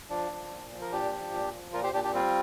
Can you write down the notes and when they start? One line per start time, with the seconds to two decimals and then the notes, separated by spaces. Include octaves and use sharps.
0.10 F3 D4
0.31 F3
0.51 A#2
0.72 F3
0.81 A#4
0.92 A#2 D4 G4
1.12 F3
1.32 A#2
1.54 F3
1.73 A#2 F4 A#4
1.83 G4 C5
1.93 A#2 D4 G4
2.03 D4 G4
2.14 G3 C4 F4